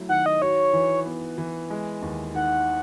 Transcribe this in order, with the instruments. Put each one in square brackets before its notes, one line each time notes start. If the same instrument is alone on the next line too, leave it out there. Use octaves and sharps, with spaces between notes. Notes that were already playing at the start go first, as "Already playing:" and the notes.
Already playing: [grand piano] F#3 A3 E4
[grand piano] D#3 [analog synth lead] F#5
[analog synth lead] D#5
[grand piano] F#4 [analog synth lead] C#5
[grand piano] E3
B3
E3
G#3
D#2
[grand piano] D#3 [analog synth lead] F#5